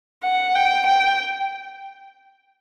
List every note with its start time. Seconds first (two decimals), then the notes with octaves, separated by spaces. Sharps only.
0.24 F#5
0.55 G5
0.86 G5